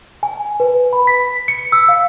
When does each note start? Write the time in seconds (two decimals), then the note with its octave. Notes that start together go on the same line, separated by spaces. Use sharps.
0.23 G#5
0.60 B4
0.93 B5
1.07 B6
1.48 C#7
1.72 E6
1.89 F5